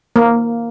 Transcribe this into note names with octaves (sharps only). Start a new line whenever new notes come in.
A#3